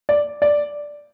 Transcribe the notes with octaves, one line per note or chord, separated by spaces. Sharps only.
D5
D5